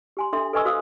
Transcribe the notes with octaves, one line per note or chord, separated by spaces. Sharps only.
G4 G#5 C6
D4 A4 E5 C6
A4 B4 D#5 G#5 C#6 E6
F#4 C5 F5 D#6 E6